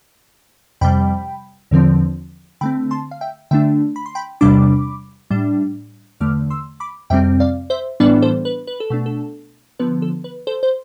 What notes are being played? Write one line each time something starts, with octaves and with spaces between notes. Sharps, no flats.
F2 C3 G3 G5 B5
E2 D3 F3 C4
D3 A3 C4 G5 B5
A5 C6
F5
E5 G5
D3 A3 D4 E5 G5
B5
C6
G5 B5
E2 C3 G3 D4 B5 D6
A2 G3 D4
E2 D3 A3 D6 F6
C6 E6
B5 D6
F2 C3 G3 C4 E5 G5
D5 F5
C5 E5
A2 E3 G3 B3 D4 B4 D5
A4 C5
B4
B4
A4
B2 A3 D4
A4
D3 F3 B3 B4
A4
B4
A4 C5
C5